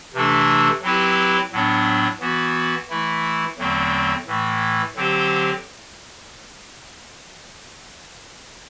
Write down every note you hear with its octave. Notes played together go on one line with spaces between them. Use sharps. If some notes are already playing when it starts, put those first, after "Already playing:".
C3 E3 A3 D4 A4
F#3 C4 E4 G4 B4
A2 F#3 B3 D4
E3 B3 F#4
E3 A3 E4
E2 D3 F#3 A3 C4
A2 E3 A3
D3 F#3 C4 G4 C5